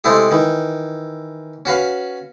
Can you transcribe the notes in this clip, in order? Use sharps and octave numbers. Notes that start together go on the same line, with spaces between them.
C3 G#3 A3 C4 E4 G#4
D#3 E3
C#4 F#4 B4 F5